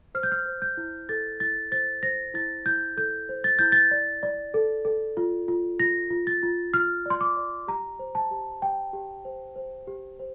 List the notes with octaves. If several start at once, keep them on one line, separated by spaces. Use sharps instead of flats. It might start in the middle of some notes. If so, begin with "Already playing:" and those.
C5 F6
G6
F6
C5
G6
E4
A4 A6
E4 A6
C5 A6
C5 A#6
E4 A6
E4 G6
A4 G6
C5
A6
E4 G6
A6
D5
D5
A4
A4
F4
F4
F4 A#6
F4
A6
F4
F4 F6
D5 C6
D6
D5
G4 A#5
C5
A5
G4
G4 G5
G4
C5
C5
G4
C5